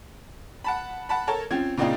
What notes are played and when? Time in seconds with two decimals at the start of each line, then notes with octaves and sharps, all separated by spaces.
0.64 F#5 A5 B5
1.09 F#5 A5 B5
1.27 A4 A#4 C#5 A5
1.51 F3 C4 C#4 G#6
1.77 A#2 C#3 C4 D4 D#4 F4